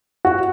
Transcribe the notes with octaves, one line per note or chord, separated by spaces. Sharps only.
F#4